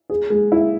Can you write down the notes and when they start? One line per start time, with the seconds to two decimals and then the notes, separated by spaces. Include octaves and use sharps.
0.10 G#4
0.30 G#3
0.52 E4